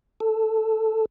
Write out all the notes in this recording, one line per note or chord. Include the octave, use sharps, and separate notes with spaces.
A4